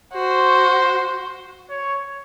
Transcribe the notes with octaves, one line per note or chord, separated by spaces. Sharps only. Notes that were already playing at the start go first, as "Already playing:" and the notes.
F#4 C5
C#5